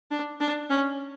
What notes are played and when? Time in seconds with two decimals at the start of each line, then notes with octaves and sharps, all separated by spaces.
0.11 D4
0.41 D4
0.70 C#4